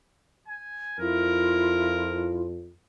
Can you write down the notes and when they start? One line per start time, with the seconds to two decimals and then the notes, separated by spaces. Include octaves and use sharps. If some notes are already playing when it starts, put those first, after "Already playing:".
0.48 G#5
0.98 F2 E4 F4 A#4